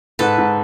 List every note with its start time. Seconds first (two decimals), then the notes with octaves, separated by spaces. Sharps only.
0.19 G#2 A4 B4
0.38 G#2